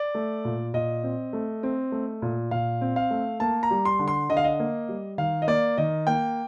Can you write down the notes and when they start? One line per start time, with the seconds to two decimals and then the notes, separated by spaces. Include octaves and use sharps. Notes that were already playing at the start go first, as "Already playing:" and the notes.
Already playing: D5
0.15 A3
0.45 A#2
0.74 A#2 D#5
1.04 C4
1.33 A3
1.63 C4
1.92 A3
2.22 A#2
2.51 A#2 F5
2.81 C4
2.96 F5
3.11 A3
3.40 A#3 A5
3.63 A#5
3.71 G3
3.85 C6
3.99 D3
4.08 C6
4.29 D3 D#5
4.37 F5
4.44 D#5
4.60 A#3
4.89 G3
5.18 D#3 F5
5.42 D#5
5.47 A#3 D5
5.77 D#3 D#5
6.07 A#3 G5